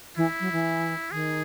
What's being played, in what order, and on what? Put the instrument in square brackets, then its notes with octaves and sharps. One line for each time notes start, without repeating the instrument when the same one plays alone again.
[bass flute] E3 [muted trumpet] E4
[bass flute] F#3
E3
[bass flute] D#3 [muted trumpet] G#4